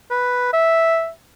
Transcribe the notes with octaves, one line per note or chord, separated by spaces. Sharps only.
B4
E5